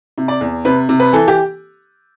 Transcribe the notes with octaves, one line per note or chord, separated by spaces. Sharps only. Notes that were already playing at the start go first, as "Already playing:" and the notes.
C3
D5
E2
C3 B4
C3
B4
E3 A4
G4